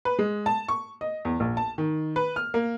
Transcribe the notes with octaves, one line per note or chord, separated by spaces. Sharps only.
B4
G#3
A5
C#6
D#5
E2
A#1
A5
D#3
B4
F6
A#3